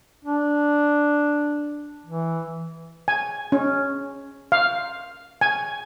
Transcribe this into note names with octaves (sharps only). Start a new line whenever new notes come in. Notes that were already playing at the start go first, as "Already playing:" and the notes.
D4
E3
G#5
C#4
F5
G#5